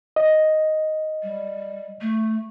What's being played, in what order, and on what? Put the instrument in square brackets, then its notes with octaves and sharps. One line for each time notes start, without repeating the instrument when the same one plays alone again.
[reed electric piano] D#5
[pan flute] G3
A3